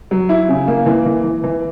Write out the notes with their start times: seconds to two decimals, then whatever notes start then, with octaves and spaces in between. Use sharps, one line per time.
0.11 F#3
0.29 E4
0.49 C#3
0.68 A#3
0.86 E3
1.06 E3
1.23 E3
1.43 E3